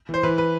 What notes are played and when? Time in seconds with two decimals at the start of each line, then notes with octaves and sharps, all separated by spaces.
0.09 E3 C5
0.23 E3 B4
0.38 B4